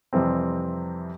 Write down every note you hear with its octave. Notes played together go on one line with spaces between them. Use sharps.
F2 C3 E3 G3 C4